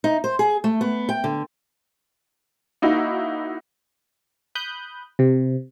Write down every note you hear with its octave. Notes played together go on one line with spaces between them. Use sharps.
D#4
C5
G#4
A3
B3
G5
D3
A#3 D#4 E4 F#4
B5 D#6 F#6 G6
C3